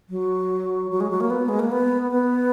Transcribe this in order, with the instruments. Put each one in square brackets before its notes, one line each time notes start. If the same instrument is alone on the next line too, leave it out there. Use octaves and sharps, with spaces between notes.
[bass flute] F#3
F#3
G#3
F#3
A#3
B3
G#3
A#3
B3
B3